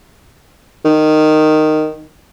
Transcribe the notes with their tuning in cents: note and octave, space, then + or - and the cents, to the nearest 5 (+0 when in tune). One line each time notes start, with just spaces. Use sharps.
D#3 -10